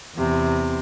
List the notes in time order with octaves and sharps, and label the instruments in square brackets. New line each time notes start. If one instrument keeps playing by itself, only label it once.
[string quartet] E2 C3